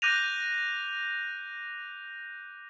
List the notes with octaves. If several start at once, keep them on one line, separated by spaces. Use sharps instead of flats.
D6 F#6 G6 A#6 D#7 F7